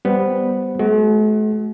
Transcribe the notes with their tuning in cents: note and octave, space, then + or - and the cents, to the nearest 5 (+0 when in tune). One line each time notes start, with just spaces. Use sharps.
G3 +0 B3 +0 C5 +0
A3 -45 F#4 +15